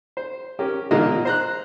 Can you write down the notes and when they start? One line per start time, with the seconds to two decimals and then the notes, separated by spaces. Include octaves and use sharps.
0.17 C5
0.59 C#4 G4 A#4
0.91 B1 A#2 D3 G#3 A#3 D#5
1.25 C5 A#5 F#6